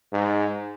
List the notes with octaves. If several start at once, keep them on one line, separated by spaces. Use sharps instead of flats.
G#2